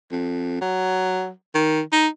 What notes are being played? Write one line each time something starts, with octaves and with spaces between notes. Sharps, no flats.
F2
F#3
D#3
D#4